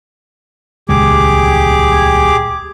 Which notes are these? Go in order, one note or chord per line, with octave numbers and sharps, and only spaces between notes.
D#1 C#2 G#3 G4 G#4 D6